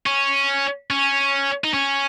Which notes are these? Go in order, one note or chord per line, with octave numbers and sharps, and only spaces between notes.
C#4
C#4
D#4
C#4